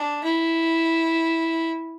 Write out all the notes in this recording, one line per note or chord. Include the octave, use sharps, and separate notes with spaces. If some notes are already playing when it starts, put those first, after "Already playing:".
Already playing: D4
E4